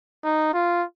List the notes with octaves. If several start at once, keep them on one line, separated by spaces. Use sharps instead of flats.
D#4
F4